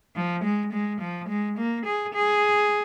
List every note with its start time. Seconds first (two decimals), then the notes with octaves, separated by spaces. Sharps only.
0.16 F3
0.44 G#3
0.73 G#3
1.01 F3
1.29 G#3
1.58 A#3
1.86 G#4
2.15 G#4